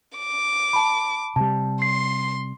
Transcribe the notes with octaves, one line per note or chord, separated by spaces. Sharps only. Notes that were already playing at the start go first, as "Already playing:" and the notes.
D6
A5 B5
C3 G3 A5
C6 C7